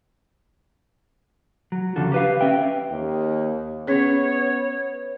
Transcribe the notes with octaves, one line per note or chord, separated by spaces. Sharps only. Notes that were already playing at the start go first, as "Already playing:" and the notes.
F#3
D#2 C#3 F3 D4 F#4 A4
G4 B4 F5
C#4 E5 G5
D#2
B3 C#4 G#4 C#5